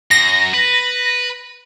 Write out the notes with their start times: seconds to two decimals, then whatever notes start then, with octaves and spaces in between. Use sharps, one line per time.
0.11 F#2 A#6
0.54 B4